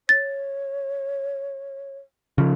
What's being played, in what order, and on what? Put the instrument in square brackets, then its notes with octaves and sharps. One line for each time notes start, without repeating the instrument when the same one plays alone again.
[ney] C#5 [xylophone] A6
[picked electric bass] C#3 F3